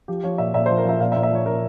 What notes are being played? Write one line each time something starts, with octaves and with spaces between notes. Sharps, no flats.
F3 G4
F3 C#5
A#2 E5
A#2 E5
F3 C5
A#4
F3 E5
A#2 F5
E5
A#2
E5
F3 C#5
A#2 A#4